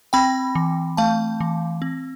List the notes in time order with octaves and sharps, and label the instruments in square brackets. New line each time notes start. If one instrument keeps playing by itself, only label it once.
[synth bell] C4 G5 B5
E3
A3 F5 A5
E3
C4